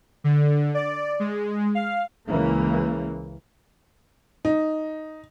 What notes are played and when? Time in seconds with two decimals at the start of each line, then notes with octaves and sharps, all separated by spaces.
0.24 D3
0.74 D5
1.20 G#3
1.75 F5
2.29 C#2 C#3 E3 A#3
4.45 D#4